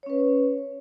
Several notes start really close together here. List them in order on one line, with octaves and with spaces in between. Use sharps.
C#5 C#4 B4